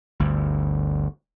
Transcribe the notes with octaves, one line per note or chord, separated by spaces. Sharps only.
G1 D2